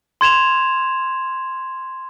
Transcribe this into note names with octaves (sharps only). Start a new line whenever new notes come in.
C6 G#6 E7 F7